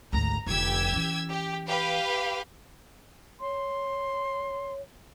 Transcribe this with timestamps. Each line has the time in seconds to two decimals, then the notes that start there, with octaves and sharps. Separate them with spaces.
0.13 G#1 D2 A#5
0.46 F1 D3 G4 E6 G#6
0.92 E3 C#4
1.30 G4
1.67 G4 B4 F5
3.40 C#5 C6